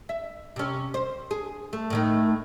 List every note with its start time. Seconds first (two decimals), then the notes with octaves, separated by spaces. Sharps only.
0.09 E5
0.56 C3 C#4
0.94 C5
1.31 G#4
1.73 A3
1.90 A2 D#3 A3